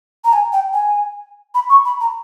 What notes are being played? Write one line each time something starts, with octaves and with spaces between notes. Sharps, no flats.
A#5
G#5
G5
G#5
B5
C#6
B5
A#5